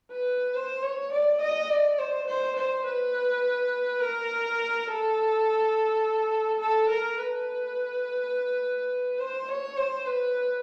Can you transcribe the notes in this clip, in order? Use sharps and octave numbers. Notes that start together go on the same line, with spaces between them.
B4
C5
C#5
D5
D#5
D5
C5
C5
C5
B4
A#4
A4
A4
A#4
B4
C5
C#5
C5
B4